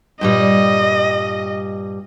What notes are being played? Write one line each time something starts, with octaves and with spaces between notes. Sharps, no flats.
G2 A#2 G3 D#5